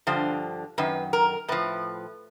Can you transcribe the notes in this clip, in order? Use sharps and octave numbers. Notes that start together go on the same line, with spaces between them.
G2 D3 F3 C5
F#2 D#3 B4
A#4
A2 F3 B4